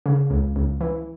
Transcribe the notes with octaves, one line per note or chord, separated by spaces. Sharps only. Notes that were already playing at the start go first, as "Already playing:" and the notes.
C#3
C#2
C#2
E3